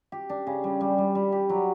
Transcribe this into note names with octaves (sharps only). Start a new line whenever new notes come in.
G4
D4
C#3
G3
G3
G3
G3
G4
F#3